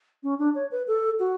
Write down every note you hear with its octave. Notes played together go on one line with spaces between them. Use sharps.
C#4
D4
C#5
B4
A4
F#4